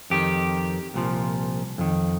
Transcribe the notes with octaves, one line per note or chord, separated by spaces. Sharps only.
F2 D#3 G4
C2 A#2 F3
F2 D#3